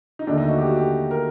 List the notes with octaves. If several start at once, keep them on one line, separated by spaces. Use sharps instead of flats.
D#4
D#2 D3 A3 D4
D#4
F#4
G4
F#4
G4
A#4